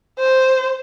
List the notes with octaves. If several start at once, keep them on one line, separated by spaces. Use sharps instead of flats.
C5